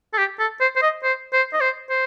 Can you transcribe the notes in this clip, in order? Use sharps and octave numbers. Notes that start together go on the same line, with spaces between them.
A4
G4
A4
C5
C5
D#5
C5
C5
D#5
C5
C5